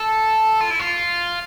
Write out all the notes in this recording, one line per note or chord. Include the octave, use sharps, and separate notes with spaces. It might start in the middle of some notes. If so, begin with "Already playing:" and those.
Already playing: A4
F4
E4
F4